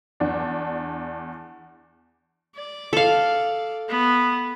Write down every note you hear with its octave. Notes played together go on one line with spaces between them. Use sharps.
E2 D4
D5
A4 F5
B3